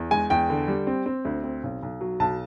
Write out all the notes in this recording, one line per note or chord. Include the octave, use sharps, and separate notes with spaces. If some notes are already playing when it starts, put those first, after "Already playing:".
Already playing: E2
G#3 G#5
E2 G5
D3
G3
C4
C4
D2
C4
B1
B1
F#3
B1 A5